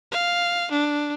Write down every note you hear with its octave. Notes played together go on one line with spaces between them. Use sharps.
F5
D4